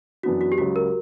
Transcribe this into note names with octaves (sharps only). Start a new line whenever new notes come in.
F#2 E3 B3 D4 F#4
F#4
G4
C#2 C#3 F#3 F#4
A#4